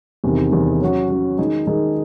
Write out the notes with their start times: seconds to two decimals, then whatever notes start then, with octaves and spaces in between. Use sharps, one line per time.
0.24 E2 C3 D#3
0.52 E2 C3 D#3
0.81 F#3 C#4 F#4
1.10 F#3 C#4 F#4
1.38 D#3 G#3 D#4 G#4
1.67 D#3 G#3 D#4 G#4